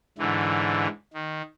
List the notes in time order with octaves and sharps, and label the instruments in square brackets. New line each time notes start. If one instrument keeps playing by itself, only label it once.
[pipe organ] G#2 D3 E3
D#3